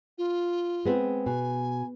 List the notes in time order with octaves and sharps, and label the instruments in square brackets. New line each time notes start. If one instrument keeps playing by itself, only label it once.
[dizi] F4
[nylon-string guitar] G#3 B3 C4
[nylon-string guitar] B2 [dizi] G#5